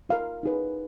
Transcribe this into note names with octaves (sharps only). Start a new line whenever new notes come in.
F4 A#4 F5
D#4 G#4 B4